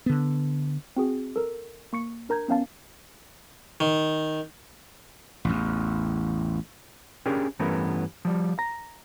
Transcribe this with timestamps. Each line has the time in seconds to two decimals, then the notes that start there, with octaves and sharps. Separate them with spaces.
0.06 D3 B3
0.96 C4 F#4 G#4
1.36 A4 A#4
1.93 A#3 C#6 C#7
2.29 D4 A#4 A#5 G6 G#6
2.48 B3 C#4 F5 A5
3.80 D#3
5.45 A1 E2
7.26 C#4 D4 G4 G#4 A#4
7.59 G2 E3 A3 B3 C#4 A#4
8.25 F3 G3
8.59 A#5